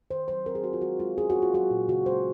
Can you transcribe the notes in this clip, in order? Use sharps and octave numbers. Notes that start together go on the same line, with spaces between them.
D#3 C5
F#3 C5
C4 A#4
G#4
C4 F#4
F4
G#3 F#4
G#3 F4
C#4 G#4
F#4
A#3
F4
F#3 F#4
A#2
C#3 F#4
G#3 C5